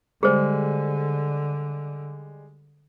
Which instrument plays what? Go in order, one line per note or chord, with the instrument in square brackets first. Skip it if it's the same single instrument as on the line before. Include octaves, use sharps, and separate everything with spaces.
[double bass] D3 [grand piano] G3 G#3 [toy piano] G#4 C5